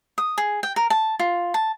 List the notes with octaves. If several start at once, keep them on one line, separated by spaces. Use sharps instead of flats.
D#6
G#4
G5
A#4
A5
F4
A5